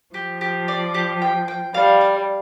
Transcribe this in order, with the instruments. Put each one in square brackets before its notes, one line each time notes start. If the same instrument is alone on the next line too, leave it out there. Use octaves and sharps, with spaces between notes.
[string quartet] F3 [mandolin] G4
[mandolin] G4
D5
G4
G5
G5
[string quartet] G3 [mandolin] F5
[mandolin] F5